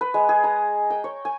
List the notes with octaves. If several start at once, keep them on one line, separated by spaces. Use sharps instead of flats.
B4
G#3
G#4
A#5
G5
C#5
G#5